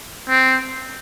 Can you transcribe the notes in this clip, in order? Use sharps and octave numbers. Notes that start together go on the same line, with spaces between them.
C4